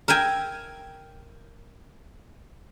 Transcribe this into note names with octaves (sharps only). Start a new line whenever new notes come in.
A#4 E5 G5 G#5